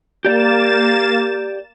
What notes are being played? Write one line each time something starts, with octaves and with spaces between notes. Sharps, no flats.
A#3 G4 D5 A6 E7